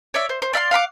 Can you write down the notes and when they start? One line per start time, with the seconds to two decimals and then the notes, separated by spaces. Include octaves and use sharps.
0.14 C#5 D5 E5
0.29 C5
0.42 C5
0.53 D5 E5 F5 C6
0.71 F5 F#5 B5 D6